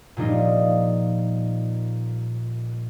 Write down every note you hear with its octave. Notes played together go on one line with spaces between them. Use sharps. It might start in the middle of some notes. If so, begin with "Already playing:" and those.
A#2 F3 G3 D#4 F4